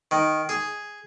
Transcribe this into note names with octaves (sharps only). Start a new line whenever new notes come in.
D#3
G#4